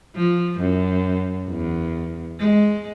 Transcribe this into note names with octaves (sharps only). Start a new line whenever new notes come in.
F3
F#2
E2
G#3